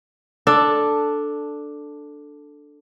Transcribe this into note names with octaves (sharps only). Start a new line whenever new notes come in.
D4 A4